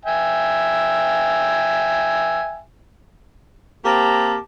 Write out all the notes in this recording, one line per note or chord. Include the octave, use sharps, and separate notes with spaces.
E5 G5 G#5
A#3 C4 G4 A5 A#5